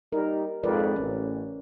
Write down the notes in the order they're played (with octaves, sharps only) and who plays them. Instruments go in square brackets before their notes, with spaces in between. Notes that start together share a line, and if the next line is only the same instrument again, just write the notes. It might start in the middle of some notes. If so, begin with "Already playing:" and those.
[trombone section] G3 D#4 [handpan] A#4
[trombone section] F2 G#2 [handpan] A#4 B4 D5
[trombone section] A1 [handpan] C#4